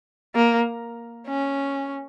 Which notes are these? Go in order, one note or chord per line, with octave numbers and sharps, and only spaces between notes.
A#3
C#4